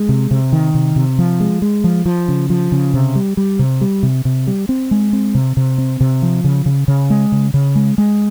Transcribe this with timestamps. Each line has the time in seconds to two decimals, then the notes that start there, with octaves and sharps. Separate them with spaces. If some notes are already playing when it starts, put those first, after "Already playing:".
Already playing: G#3
0.09 C3
0.31 C3
0.52 D#3
0.75 C3
0.96 C3
1.18 F3
1.40 G#3
1.62 G#3
1.84 F3
2.06 F3
2.28 C#3
2.50 F3
2.72 C#3
2.94 C3
3.15 G3
3.37 G3
3.59 C3
3.81 G3
4.03 C3
4.25 C3
4.47 G3
4.69 C4
4.91 G#3
5.13 C4
5.35 C3
5.57 C3
5.78 C4
6.00 C3
6.22 F3
6.44 C#3
6.66 C#3
6.88 C#3
7.10 G#3
7.32 C#3
7.54 C#3
7.76 G#3
7.98 G#3